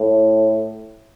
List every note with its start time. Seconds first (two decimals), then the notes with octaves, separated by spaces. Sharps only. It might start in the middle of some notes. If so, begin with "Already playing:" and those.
Already playing: A2